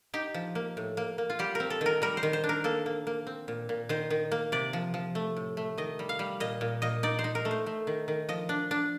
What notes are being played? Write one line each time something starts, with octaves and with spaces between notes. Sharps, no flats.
D#4 G4
F3
A#3
A2
A#3
A#3
F4
G3 G4
A#4
C4
A4
D#3 A#4
G3 A#4
C5
D#3
C5
D4
A#4
A#3 A4
A#3
A#3
C4
A#2
A#2
D#3 C5
D#3
A#3
C3 D5
F3
F3
A3
A2
A3
D#3 D#5
G3
F5
G3
A#2 D#5
A#2
A#2 D#5
D#4 D5
C5
D#4
A#4
A3
C5
A3
D#3
D#3
F3 D#5
D4
D4